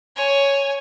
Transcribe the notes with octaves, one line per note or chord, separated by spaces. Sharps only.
C#5 G#5